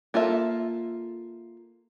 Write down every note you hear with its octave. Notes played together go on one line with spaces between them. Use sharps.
A#3 F4 A4 E5